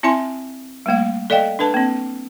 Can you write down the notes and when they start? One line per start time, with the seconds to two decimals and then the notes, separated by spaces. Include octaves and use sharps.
0.03 C4 E4 E5 G#5 C6
0.86 G3 A3 A#3 F5
1.30 A4 D5 D#5 F5 G5
1.59 D4 A4 B4 A5
1.74 A#3 C4